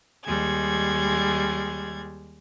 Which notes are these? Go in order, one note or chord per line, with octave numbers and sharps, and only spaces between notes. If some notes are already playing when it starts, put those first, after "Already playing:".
D#2 G3 G#3 G#6